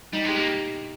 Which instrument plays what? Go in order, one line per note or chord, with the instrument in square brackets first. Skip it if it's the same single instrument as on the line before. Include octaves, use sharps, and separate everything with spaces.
[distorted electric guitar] G3 [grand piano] D#4
[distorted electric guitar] G#3 [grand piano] G4
[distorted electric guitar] A#3
[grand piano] G4